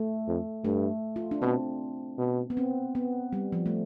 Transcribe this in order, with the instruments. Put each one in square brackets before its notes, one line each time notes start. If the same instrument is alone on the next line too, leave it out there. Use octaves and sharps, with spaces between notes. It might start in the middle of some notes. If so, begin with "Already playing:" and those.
Already playing: [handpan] A3
[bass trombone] F2
[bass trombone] G2 [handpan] A3
[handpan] F4
D4
[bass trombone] B2 [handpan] C4
[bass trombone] B2
[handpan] B3
C4
B3
G3
F3
A3